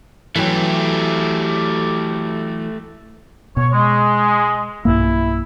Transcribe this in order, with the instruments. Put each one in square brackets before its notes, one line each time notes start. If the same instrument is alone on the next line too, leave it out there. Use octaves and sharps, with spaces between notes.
[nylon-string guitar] E3 F#3 [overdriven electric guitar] A3 G4
[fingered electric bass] B2 [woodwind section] C#5
[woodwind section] G#3
[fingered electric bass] B1 G2 A#3 [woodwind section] E4